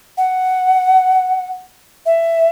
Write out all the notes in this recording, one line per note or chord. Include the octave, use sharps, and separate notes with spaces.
F#5
E5